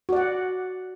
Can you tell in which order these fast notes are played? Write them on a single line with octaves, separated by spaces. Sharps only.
F#4 D5 F#5